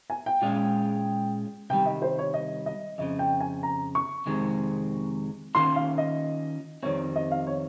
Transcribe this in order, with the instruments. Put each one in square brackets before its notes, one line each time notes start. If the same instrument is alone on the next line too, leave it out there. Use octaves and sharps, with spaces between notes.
[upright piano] G#5
G5
[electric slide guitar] A#2 G#3 C#4 F4
[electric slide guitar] C3 D#3 G3 [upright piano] G5
[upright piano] D#5
C5
C#5
D#5
D#5
[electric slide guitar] F2 C#3 F3 [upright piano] D#5
[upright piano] G5
G#5
A#5
C#6
[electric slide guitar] F2 C3 D#3 G#3 C4
[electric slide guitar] D#3 A#3 C#4 F4 [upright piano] C6
[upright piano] F5
D#5
[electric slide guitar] F2 D#3 G3 C4 [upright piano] C#5
[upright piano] D#5
F5
C#5